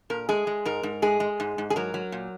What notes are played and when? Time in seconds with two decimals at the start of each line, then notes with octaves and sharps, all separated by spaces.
0.10 A#2 A#4
0.29 G#3 G#4
0.47 G#3
0.65 G#2 A#4
0.83 G#2
1.02 G#3 G#4
1.20 G#3
1.40 G#2
1.58 G#2
1.70 G#4
1.76 F#3 A#4
1.94 F#3
2.12 A#2